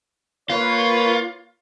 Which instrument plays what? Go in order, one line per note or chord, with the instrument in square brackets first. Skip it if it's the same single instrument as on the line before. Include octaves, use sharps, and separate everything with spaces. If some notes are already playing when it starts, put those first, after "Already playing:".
[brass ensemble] A#3 B4 C#5 [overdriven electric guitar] F4